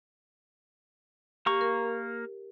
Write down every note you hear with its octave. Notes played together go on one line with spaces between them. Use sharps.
A#3 G4 A#5 C#6
A#4